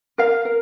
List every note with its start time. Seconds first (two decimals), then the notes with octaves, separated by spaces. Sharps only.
0.18 A#4 F5
0.45 A#4